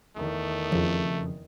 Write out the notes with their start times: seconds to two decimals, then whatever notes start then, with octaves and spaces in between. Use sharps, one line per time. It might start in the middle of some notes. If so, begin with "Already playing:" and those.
0.16 E2 D#3 A3
0.72 F2 C#3 F3